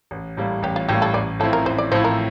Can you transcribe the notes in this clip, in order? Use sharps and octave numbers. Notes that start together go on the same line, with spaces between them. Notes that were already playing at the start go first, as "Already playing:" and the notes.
A1
A2 G3 A#3
A1 G4
F4
A2 G3 A#3 G4
A4
A1 D5
A2 F3 C4 E4 A4
A#4
A1 C5
D5
A2 F3 C4 E4 C5
A#4